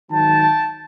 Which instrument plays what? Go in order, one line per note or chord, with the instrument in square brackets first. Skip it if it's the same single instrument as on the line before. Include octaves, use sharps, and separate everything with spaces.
[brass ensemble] G#2 D#3 F#3 G5 A5